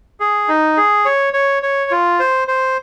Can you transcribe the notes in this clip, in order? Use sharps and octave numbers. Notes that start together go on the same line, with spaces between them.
G#4
D#4
G#4
C#5
C#5
C#5
F4
C5
C5